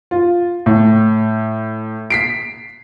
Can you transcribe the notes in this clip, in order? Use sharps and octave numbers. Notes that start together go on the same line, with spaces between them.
F4
A2
B6 C7 D7